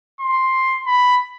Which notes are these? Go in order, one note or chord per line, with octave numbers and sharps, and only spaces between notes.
C6
B5